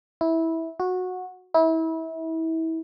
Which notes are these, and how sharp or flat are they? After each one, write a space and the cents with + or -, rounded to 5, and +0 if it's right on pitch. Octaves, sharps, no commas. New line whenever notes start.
E4 -15
F#4 -15
E4 -30